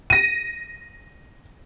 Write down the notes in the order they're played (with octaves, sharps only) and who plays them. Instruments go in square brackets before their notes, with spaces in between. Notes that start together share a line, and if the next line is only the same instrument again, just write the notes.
[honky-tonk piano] A#6 D#7